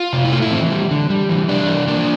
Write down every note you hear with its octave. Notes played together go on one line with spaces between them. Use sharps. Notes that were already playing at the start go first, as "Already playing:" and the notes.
Already playing: F4
C3
E4
A3 F4
E4
E3 C4
G3
D3
G3
E3
G3 D4
E3
A#3 D4